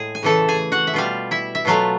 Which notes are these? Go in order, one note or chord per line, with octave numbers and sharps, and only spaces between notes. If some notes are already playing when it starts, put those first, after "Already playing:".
Already playing: A2 G#3 G#4
G#5
C#3 E3 A3 A4 A5
G#4 G#5
F#4 F#5
E5
B2 G3 F4 F5
E4 E5
E5
B2 F#3 A3 F4 F5